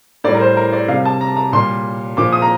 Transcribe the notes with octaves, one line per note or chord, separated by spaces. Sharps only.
A2 G3 D5
A#4
C5
A#4
D5
C3 G3 F5
A5
A#5
A#5
A#2 G3 C6
A#2 F3 D6
D#6
A#5